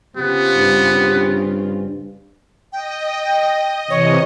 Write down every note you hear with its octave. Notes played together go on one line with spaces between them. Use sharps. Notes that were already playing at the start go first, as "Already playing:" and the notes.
C#3 B3 C4 F4 G4
G2
D#5 G5
C3 E3 C#5